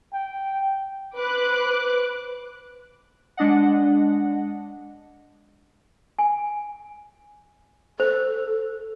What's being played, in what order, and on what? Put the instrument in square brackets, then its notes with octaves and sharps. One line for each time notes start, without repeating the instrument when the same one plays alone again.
[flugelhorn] G5
[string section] B4 C5 D6 F#6
[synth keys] G#3 D4 D#5 F#5
[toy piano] G#5
[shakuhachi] A4 [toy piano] C5